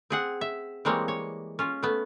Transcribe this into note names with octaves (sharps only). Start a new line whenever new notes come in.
C4 G#4 F#5
E5
E3 G3 G#3 A#3 C4 C#5
C#5
C#4 F4
A3 B3